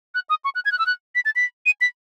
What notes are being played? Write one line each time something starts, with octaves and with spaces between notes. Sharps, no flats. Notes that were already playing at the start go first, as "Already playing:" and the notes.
F#6
D#6
C#6
F#6
G#6
F#6
E6
F#6
B6
A6
B6
D#7
B6